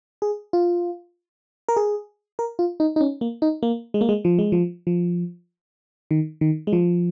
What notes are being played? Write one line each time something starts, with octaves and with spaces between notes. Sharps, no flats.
G#4
F4
A#4
G#4
A#4
F4
D#4
D#4
C#4
A#3
D#4
A#3
G#3
A#3
G#3
F3
G#3
F3
F3
D#3
D#3
G#3
F3